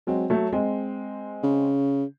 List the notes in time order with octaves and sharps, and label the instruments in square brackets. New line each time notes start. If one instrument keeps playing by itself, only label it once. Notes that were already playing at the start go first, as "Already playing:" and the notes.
[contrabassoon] F#3 [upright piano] G#3 C4
[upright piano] F#3 A3
G#3 C4
[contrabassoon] C#3